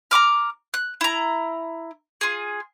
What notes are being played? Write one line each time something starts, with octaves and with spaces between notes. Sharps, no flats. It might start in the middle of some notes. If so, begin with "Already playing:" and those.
A#5 B5 D6 F6
F#6
E4 A#5
F4 G#4